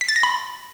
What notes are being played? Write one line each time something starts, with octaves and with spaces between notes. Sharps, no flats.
B6
A6
A#6
B5